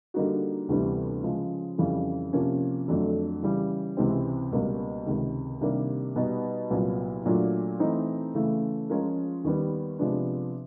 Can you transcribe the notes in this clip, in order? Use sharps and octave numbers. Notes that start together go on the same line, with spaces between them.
D3 G3 A#3 D#4 F#4
D2 C3 E3 G3 B3
C#3 F3 G#3
F2 C#3 E3 G3
C3 F3 A#3 C#4
F2 D3 F#3 A3 D4
C#3 E3 G3
C#2 C3 E3 G#3 C4
C#2 B2 G3 A#3
C#2 C3 D#3
C3 D#3 G3 A#3 D4
B2 G3 B3 D#4
C2 A#2 F#3 B3
A#2 F#3 A3 D4 F4
E3 A3 C4 D#4
C#3 E3 A3
F3 G#3 C#4 F4 A#4
D#2 D#3 G3 B3
C3 F3 G#3 B3 D4